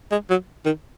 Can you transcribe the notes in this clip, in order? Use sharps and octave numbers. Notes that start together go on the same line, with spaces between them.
G#3
F#3
D#3